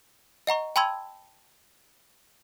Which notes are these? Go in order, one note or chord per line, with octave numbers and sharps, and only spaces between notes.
D#5 F#5 A#5 C#6
G5 A5 B5 C6 E6 G#6